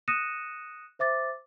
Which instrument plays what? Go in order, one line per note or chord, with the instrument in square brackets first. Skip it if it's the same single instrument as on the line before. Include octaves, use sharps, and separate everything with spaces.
[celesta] D#6 F#6 A#6 C#7 D#7 E7
C5 E5 D6 A6